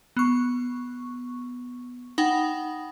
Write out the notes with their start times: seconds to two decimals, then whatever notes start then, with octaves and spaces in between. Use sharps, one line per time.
0.16 B3 C#6
2.18 D#4 F#5 G5 B5